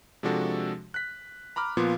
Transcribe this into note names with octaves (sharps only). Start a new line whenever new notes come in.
C3 F3 G#3 D4 F#4 A4
F#6 B6
A#5 B5 D6 F6
A#2 F3 B3 F4